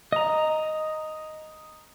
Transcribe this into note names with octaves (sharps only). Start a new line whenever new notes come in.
D#5 A#5